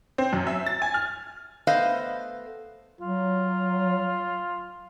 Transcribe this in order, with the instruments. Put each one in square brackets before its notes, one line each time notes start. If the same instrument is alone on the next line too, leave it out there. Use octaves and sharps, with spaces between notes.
[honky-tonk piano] C4
F#2
E5
A6
G#5
F6
[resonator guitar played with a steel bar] A3 B3 B4 C5 D#5 F5
[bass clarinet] F#3 [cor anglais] F4